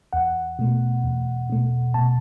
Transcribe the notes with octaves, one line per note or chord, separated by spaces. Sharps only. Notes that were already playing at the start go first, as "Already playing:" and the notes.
E2 F#5
B2 A3
E2
B2 A3
B2 A5